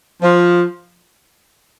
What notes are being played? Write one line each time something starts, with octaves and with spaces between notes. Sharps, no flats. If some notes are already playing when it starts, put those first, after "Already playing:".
F3